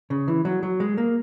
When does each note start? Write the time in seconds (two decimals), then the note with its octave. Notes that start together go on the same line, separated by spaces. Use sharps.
0.10 C#3
0.28 E3
0.45 F#3
0.63 F#3
0.80 G#3
0.97 A#3